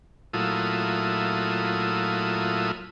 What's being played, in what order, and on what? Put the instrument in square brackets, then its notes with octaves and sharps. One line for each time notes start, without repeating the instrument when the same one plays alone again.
[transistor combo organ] A#2 F#3 A3 E4 F4 D#6